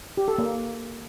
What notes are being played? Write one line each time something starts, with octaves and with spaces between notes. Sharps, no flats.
G4
A4
A#3